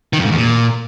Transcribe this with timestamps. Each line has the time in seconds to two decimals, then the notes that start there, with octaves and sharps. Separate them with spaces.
0.13 D#3
0.19 F2
0.25 G#2
0.32 E2
0.38 A#2